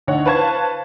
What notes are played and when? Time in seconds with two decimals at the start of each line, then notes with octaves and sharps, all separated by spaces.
0.07 D2 D4 D#4 C#5 F#5
0.26 B4 C5 F5 A5 C#6 G#6